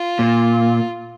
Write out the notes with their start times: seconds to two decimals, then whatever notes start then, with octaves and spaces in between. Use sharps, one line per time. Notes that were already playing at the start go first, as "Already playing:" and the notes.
Already playing: F4
0.19 A#2